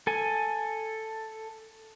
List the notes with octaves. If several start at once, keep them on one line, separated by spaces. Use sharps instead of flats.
A4 G#5